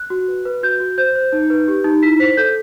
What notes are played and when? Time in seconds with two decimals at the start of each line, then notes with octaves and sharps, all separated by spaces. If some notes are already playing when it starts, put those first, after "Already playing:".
Already playing: F#6
0.10 F#4
0.28 B4
0.45 B4
0.63 F#4 G6
0.80 F#4
0.98 C5 G6
1.15 C5
1.32 D#4
1.50 B4
1.68 G4
1.84 D#4
2.03 E4 B6
2.19 C5 B6
2.37 A4 G6